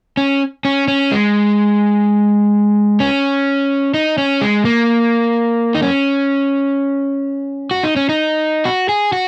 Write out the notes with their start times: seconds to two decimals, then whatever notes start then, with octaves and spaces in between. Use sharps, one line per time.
0.17 C#4
0.65 C#4
0.88 C#4
1.12 G#3
3.00 C#4
3.94 D#4
4.18 C#4
4.41 G#3
4.65 A#3
5.75 D#4
5.82 C#4
7.71 F#4
7.84 D#4
7.96 C#4
8.09 D#4
8.65 F#4
8.89 G#4
9.13 F#4